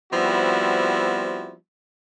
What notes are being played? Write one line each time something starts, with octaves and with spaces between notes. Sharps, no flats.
F3 G3 B3 C4 E4 F#4